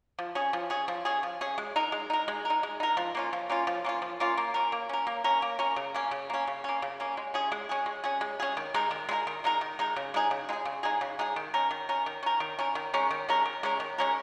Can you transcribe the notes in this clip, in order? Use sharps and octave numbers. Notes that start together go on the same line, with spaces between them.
F3
C#4 G#4
F3
C#4 G#4
F3
C#4 G#4
F3
C#4 G#4
G#3
D#4 A#4
G#3
D#4 A#4
G#3
A#4
D#4
G#3
D#4 A#4
F3
A#3 C#4 F4
F3
A#3 C#4 F4
F3
A#3 C#4 F4
F3
A#3 C#4 F4
A#3
C#4 A#4
A#3
C#4 A#4
A#3
C#4 A#4
A#3
C#4 A#4
C#3
A#3 C#4
C#3
A#3 C#4
C#3
A#3 C#4
C#3
A#3 C#4
G#3
C#4 G#4
G#3
C#4 G#4
G#3
C#4 G#4
G#3
C#4 G#4
D#3
G#3 D#4 A#4
D#3
G#3 D#4 A#4
D#3
G#3 D#4 A#4
D#3
G#3 D#4 A#4
C#3
G#3 D#4 G#4
C#3
G#3 D#4 G#4
C#3
G#3 D#4 G#4
C#3
G#3 D#4 G#4
D#3
C#4 A#4
D#3
C#4 A#4
D#3
C#4 A#4
D#3
C#4 A#4
D#3
G#3 C#4 A#4
D#3
G#3 C#4 A#4
D#3
G#3 C#4 A#4
D#3
G#3 C#4 A#4